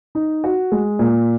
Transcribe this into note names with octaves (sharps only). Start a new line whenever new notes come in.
D#4
F#4
G#3
A#2